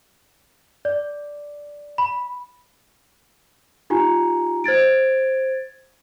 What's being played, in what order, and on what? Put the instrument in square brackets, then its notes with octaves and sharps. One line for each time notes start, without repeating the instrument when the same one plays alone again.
[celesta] D5
B5
D#4 F4 G4 G#5 A#5
C5 G#6 A6 D7